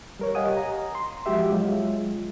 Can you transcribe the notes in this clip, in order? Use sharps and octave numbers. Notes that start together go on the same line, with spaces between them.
G3 A#4 C#5
G4 D#5 F5 F#5 G#5 D#6
A#5
C6
F3 G#3 F#4 G4 E5
F#3 G#3 F4